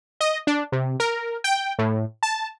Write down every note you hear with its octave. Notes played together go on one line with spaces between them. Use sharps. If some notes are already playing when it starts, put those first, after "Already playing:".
D#5
D4
C3
A#4
G5
A2
A5